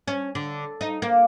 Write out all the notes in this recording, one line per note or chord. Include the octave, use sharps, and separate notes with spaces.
C#4
D3
D#4
A#3